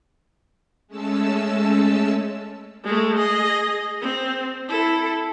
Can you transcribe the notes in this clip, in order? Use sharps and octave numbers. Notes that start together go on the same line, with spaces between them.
G#3 A3 C#4 A5 E6
G#3 A3
G#4 D#5
C4
E4 A4